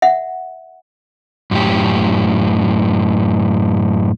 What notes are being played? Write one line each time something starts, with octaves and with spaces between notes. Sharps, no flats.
E5 F#5
F#2 A2 G4